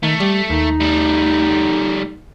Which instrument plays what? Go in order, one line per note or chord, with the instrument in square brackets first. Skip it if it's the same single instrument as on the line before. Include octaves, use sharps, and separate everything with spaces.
[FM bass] D#3 [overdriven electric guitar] A3
[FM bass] G3
[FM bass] D#2 [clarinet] D#4
[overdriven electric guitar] G3 A3